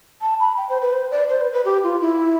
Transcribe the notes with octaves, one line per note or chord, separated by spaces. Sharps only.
A5
B5
G5
C5
B4
C5
D5
C5
B4
B4
G4
F4
E4